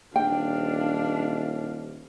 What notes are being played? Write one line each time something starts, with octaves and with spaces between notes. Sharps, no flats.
D#1 D4 F5 G5